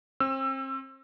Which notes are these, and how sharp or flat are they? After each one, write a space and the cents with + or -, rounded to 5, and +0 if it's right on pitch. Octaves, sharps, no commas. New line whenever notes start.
C4 +35 E6 +20